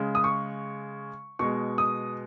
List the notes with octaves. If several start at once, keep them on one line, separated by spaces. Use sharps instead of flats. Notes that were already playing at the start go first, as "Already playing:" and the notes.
Already playing: C#3 G#3
D#6
C#6
B2 G#3 C#6
D#6